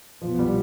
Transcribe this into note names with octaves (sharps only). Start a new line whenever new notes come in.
C2 B2 F3 B3
G3